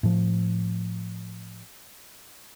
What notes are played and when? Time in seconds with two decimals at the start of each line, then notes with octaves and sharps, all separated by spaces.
0.03 A2 F3